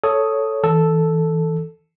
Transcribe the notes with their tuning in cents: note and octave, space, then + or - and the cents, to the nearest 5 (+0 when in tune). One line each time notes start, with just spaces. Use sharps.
A4 +0 C#5 +5 D#6 +0
E3 -30 A4 +0